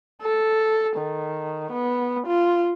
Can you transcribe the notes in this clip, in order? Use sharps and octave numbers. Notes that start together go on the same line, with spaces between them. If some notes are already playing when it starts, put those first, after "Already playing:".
A4
D#3
B3
F4